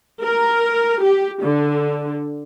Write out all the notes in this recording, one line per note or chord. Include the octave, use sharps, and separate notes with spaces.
A#4
G4
D3